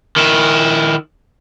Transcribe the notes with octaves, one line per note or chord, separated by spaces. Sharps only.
D#3 E4